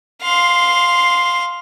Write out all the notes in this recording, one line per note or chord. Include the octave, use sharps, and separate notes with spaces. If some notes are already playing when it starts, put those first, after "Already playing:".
F5 C6